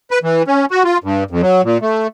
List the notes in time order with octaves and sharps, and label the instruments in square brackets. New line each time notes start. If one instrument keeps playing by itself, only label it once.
[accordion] B4
E3
C#4
F#4
F4
G2
F2
F#3
A#2
A3